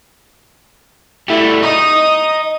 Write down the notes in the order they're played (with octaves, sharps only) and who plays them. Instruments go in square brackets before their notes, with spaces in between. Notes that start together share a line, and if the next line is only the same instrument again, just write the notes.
[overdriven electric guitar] G3 A3 [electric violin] E4
[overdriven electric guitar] D#5 A#5 [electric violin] D#6